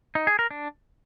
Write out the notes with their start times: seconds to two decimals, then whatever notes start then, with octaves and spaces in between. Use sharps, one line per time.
0.15 D#4
0.27 G#4
0.39 A#4
0.51 D4